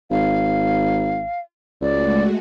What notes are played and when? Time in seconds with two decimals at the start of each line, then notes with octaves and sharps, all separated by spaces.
0.11 G#1 F5
1.82 C#2 G#3 A3 F#4 D5